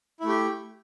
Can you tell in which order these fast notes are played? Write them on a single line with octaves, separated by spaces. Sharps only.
E4 A3 G4